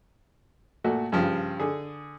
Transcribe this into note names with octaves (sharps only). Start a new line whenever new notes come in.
A#2 A3 F#4
G2 C#3 F3
D3 G#4